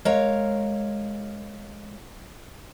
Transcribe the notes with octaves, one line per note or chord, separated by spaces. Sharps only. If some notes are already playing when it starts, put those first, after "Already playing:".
G#3 A#4 C#5 F5 A#5